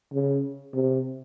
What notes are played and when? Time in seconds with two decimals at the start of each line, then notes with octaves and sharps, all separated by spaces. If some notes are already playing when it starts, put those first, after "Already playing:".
0.13 C#3
0.74 C3